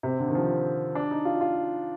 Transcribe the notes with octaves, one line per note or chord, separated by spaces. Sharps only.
C3
D3
D#3
F3
D4
D#4
F4
F4